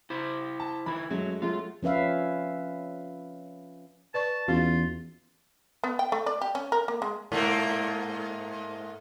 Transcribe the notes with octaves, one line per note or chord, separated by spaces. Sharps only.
E4 C5
A5
D#3 E4 B5
F#2 F#3 G#3 A3
F#3 G#3 A3 F4
F3 C#4 B4 E5 F5
B4 D5 A5 C#6
E2 C#4 F4 F#4 F5
B3
G5
A3
D5
G4
C#4
A#4
A#3
G#3
G#2 A3 A#3